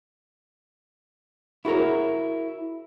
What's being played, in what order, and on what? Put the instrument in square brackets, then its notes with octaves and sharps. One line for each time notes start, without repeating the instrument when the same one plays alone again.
[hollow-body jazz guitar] E4 F#4 G#4 A#4 C#5